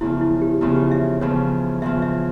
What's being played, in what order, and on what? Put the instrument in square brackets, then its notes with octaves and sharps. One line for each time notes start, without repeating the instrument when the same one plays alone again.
[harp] E2 C#3 F3 [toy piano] E4
[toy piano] E4
G4
[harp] E2 C#3 F3 [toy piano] E4
[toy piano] G4
E5
[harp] E2 C#3 F3 [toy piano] C#5
[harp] E2 C#3 F3 [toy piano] E5
[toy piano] E5